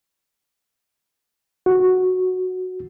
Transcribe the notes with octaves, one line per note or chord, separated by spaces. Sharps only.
F#4